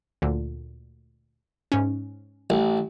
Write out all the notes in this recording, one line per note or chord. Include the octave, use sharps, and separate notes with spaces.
D2 A#2 D3
G#2 C#4
A1